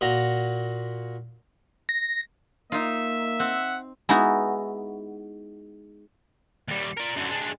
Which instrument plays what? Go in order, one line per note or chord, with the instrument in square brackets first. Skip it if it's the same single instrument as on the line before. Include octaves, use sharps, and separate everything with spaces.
[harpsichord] A#2 F#4 A#5
[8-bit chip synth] A#6
[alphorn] A#3 [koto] D#4 F4 [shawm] E5
[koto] C4 [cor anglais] F#5
[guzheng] G#3 B3 D#4 E4 F#4
[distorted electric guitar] D#2 G3
A#4 D5
F#2 D3
G#3 D4